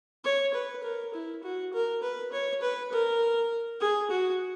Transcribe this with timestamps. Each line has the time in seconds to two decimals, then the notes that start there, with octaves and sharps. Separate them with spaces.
0.24 C#5
0.54 B4
0.83 A#4
1.14 E4
1.43 F#4
1.73 A#4
2.03 B4
2.32 C#5
2.62 B4
2.92 A#4
3.80 G#4
4.11 F#4